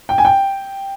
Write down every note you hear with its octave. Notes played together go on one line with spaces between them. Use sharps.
G5
G#5
G5